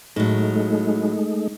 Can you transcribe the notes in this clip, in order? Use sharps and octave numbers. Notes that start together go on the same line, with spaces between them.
A2 F#3 G#3 A3 D#4